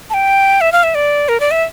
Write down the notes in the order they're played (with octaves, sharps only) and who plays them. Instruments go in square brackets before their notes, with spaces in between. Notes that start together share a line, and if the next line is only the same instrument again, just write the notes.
[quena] A5
G5
E5
F5
E5
D5
A#4
D5
E5